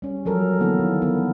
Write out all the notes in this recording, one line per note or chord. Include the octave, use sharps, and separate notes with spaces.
G3 C#4
F3 F#3 A4 A#4
D3 E3 A#3 B3 E4 A4
D#3
B3 A#4